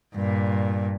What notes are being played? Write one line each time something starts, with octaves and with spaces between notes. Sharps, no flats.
G2 A#2